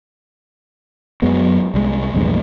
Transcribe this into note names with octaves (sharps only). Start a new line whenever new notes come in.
F#2 F#3 G#3 B3
C2 F3 G#3
A#1 E2 G2 A3